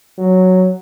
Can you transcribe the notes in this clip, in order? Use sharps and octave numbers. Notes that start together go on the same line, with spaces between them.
F#3